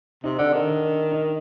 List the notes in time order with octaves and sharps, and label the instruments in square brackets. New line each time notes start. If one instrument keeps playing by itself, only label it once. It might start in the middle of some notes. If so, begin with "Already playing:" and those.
[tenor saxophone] C3 [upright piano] D#4
[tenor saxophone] D3 [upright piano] D4
[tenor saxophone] D#3 [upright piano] D4
[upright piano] D4
D#4